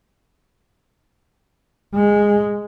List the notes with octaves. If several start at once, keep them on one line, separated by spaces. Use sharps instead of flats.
G#3